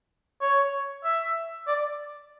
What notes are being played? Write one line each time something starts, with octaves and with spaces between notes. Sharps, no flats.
C#5
E5
D5